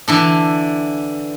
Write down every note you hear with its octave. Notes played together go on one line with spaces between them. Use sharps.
D3 E3 D4